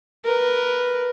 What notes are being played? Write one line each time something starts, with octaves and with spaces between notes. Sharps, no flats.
A#4 B4